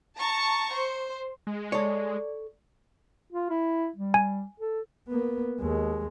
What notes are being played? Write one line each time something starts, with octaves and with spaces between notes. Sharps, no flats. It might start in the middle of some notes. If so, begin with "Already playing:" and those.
A5 A#5 C#6
C5
G#3
A4 C#5 D5
F4
E4
G3
G#5
A4
A#3 B3
D#2 G#3